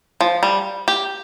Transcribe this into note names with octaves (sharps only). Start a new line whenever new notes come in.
F3
G3
G4